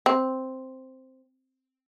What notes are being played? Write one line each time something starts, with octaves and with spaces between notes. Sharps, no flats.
C4